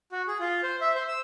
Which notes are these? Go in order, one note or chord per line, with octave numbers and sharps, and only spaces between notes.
F#4
G#4
F4
C5
E5
C5
E6